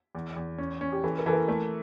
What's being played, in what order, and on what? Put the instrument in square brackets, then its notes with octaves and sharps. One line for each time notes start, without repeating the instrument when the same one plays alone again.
[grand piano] E2
E2
C#4
C#4
[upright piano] G4
[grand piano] E3 [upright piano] A4
[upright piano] A#4
[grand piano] E3 [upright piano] A4
[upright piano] A#4
[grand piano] A3 [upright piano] A4